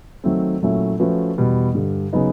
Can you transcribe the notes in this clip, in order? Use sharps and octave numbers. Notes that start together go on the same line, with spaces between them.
D#3 F#3 A3 C4
A#2 F#3 A3 C#4 E4
F3 A3 C#4 F#4 B4
E2 B2 G3
G2 D3 G3
C#3 F#3 B3 D#4